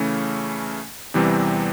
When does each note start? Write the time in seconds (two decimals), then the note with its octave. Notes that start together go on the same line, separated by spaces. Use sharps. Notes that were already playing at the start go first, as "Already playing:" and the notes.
Already playing: C#3 E3 A3 C#4
1.14 E2 C3 E3 G3 C4